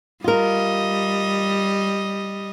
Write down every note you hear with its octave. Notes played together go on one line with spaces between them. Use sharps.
G3 F4 A#4 D#5